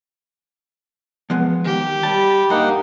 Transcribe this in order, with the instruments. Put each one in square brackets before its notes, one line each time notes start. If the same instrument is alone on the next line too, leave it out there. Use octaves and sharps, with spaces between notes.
[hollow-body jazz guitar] F3 G#3 B3
[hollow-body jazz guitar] D#3 [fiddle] G4
[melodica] G3 [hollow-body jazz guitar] A5
[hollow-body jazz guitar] G2 [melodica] A#3 D#4 F#5